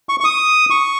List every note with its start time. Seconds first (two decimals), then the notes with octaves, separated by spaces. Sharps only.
0.09 C#6
0.20 C#6
0.24 D#6
0.70 C#6